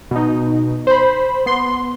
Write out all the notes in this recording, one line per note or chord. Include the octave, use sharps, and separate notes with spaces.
B2 D#4
C5 B5
B3 C6